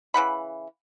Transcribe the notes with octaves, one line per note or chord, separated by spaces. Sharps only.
C#3 E3 F#5 B5